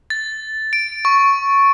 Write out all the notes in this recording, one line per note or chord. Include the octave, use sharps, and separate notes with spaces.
A6
D7
C#6